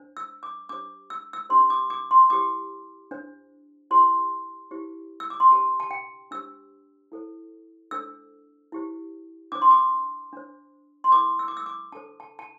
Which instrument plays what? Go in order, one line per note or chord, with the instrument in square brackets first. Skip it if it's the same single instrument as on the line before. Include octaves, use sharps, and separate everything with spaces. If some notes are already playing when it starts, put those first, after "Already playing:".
Already playing: [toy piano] D4 C5
E6
D6
D4 G4 C5 D6
E6
E6
D4 G4 C5 C6
D6
D6
C6
E4 G4 C5 D6
D4 C5
E4 G4 C5 C6
E4 G4 C5
E6
D6
C6
D4 G4 C5 A5
A5
G5
D4 G4 C5 E6
E4 A4 C5
D4 A4 C5 E6
E4 G4 C5
D4 C5 D6
C6
D6
D4 C5
C6
E4 A4 C5 D6
E6
D6
E6
D6
D4 A4 C5 A5
A5
A5